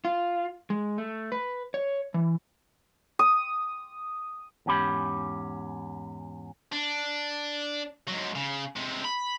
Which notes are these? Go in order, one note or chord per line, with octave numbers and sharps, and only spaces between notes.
F4
G#3
A3
B4
C#5
E3
D#6
E2 G#2 C#4 G4 B5
D4
G#2 F#3
C#3
C3 G#3
B5